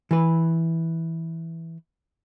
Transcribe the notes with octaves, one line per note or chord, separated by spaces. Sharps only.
E3 B4